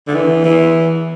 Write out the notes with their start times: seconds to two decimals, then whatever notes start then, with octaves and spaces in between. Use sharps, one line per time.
0.07 D3
0.15 E3
0.45 E3